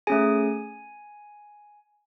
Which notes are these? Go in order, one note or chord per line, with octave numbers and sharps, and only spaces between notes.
A3 C#4 G#4 G#5